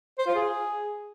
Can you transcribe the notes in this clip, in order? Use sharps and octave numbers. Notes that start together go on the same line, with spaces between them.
C5
F4
G#4